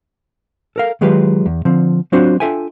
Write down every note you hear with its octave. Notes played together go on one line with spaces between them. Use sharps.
A4 A#4 F5
D#3 F#3 G#3 F4 G4 B4
E2
D3 F3 C4
F#3 C4 D4 F4 F#4 C5
D4 F4 A4 E5 G5 G#5